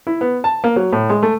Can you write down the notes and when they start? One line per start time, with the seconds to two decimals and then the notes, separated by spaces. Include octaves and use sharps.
0.07 E4
0.21 B3
0.44 A5
0.64 A#3
0.76 F#3
0.93 A2
1.10 G#3
1.23 A3